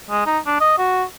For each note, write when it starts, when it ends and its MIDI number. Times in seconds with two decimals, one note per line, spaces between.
0.10 0.24 56
0.26 0.38 63
0.46 0.60 62
0.60 0.76 75
0.78 1.04 66